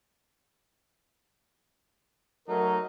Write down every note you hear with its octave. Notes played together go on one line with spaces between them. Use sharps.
F#3 A3 D#4 A#4